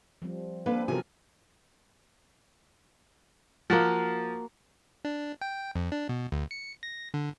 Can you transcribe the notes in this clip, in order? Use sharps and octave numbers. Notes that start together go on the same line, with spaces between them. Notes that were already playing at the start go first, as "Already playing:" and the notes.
F3 G3 C4
A#3 C4 D4 A4 B4
C3 F3 F#3 B3 A4 A#4 G#5
F3 A#3 F#4 F#5
D4
G5
F2
D4
B2
D2
C#7
A#6
D3